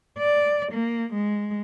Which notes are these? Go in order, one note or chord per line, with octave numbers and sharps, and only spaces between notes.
D5
A#3
G#3